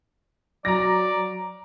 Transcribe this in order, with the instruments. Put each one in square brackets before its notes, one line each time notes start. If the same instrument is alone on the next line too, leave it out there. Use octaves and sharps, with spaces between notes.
[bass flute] F#3 [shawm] D5 [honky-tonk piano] A#5 A#6